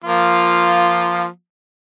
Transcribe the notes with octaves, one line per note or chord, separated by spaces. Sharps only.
F3 A#3 F4